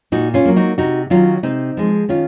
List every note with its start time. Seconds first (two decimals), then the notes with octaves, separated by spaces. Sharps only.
0.12 A#2 D#4 F#4
0.34 C#4 F4
0.46 F#3 A#3
0.56 D#4 F#4
0.78 C3 D#4 F#4
1.10 D#3 F#3 C#4 F4
1.43 C3 C4 D#4
1.77 F3 G#3
2.09 D#3 C#4 F4